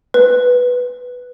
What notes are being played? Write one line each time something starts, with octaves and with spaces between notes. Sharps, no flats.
B4